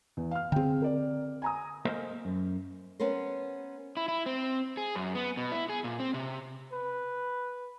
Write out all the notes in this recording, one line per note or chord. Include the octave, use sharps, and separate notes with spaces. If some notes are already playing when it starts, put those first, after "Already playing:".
E2
F5 F6
D3 C4 G#4 G5
A#4 D5
G#5 A#5 D#6
A#3 A4 C5 D#5 F5
F#2
B3 C#4 A#4 C5
E4
E4
C4
G#4
F#2
B3
B2
E4
G#4
A#2
C4
C3
B4